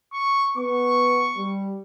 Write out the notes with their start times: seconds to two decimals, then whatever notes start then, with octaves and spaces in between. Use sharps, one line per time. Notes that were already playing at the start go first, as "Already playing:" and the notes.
0.13 C#6
0.57 B3 C#6
1.37 G3